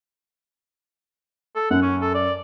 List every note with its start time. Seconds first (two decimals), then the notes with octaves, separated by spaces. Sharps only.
1.56 A4
1.71 F#2 F#5
1.82 C#4
2.02 A4
2.15 D5